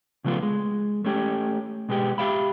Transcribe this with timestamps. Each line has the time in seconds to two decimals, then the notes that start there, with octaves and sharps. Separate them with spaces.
0.24 C#3 F3 A3 B3 F4
0.43 G#3
1.05 A3 C#4 G4
1.89 B2 G#3 B3 G4
2.18 G4 E5 F5 B5